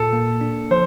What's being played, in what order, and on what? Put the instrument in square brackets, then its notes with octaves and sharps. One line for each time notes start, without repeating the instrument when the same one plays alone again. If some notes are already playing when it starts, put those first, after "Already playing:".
Already playing: [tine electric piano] A#2 [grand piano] A4
[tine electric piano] A#3
D4
[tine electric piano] F3 [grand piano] C5